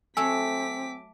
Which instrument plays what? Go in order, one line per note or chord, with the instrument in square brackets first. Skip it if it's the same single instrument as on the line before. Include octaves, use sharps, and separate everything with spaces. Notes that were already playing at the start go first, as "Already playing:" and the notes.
[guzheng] F#3 A3 A4 [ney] C4 [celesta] G#5 E6 [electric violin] D6 B6